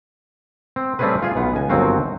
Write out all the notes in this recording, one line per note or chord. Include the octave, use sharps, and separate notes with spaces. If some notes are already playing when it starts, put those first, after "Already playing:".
C4
G3 A3 C4 C#4 G#4 B4
F4 G#4
B1 B3
C#2 G#5
G1 D#2 F#3 C4 F#4 F5